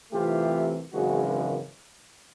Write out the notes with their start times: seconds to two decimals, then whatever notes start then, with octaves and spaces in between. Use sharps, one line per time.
0.12 C2 C3 E3 A3 F4 G4
0.92 G#1 F#2 C#3 E3 G#3 F#4 G#4